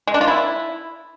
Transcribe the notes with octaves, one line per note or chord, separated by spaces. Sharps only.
G#3
D4
F4
E4